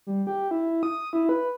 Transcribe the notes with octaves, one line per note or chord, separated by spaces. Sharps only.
G3
G4
E4
D#6
E4
B4